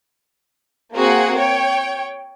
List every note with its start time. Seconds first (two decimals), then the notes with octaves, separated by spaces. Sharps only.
0.94 A#3 C4 F#4 G#4 F#5
1.36 C#5 G5